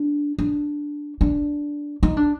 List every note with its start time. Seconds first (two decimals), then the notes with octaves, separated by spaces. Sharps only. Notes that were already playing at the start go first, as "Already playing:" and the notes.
Already playing: D4
0.38 D4
1.21 D4
2.03 D#4
2.17 D4